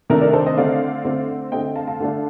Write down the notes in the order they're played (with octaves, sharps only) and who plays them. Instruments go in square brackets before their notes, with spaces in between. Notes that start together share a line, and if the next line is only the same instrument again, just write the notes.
[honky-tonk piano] C3 D#3 A3 D4 A#4 D5
A#4 D5
A4 C5
C5 D#5
D3 A3 C4 D5 F5
D3 A3 C4
D3 A3 C4 D#5 G5
F5 A5
F5 A5
D3 A3 D4